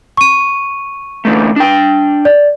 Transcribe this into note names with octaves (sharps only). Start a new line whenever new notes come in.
C#6 D#7
D3 E3 A3
D4 G5
D5